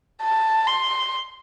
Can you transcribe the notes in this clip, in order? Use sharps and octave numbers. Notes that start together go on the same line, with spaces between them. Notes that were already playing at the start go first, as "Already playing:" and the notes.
A5
C6